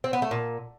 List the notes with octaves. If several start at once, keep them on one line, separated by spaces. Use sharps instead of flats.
C4
B3
A3
A#2